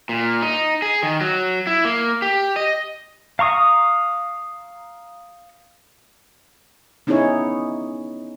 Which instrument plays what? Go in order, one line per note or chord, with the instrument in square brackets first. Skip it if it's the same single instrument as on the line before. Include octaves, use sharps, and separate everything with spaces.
[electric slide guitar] A#2
D#4
G#4
D#3
F#3
E4
A#3
G4
D#5
[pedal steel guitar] F5 A#5 C#6 D#6
[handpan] B3 C#4 D#4 E4 G#4 C#5